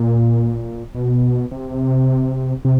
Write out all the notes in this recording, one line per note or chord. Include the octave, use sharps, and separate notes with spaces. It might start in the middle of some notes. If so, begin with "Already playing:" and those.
Already playing: A#2
B2
C3
C3